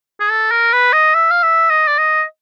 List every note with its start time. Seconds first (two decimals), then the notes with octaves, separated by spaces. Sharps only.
0.20 G#4
0.31 A4
0.51 A#4
0.73 B4
0.93 D#5
1.14 E5
1.31 F5
1.43 E5
1.70 D#5
1.88 D5
1.98 D#5